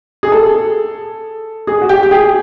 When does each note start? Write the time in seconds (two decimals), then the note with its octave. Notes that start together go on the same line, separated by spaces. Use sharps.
0.23 G#4
0.32 A4
1.67 G#4
1.82 F#4
1.89 G4
2.03 G4
2.11 G#4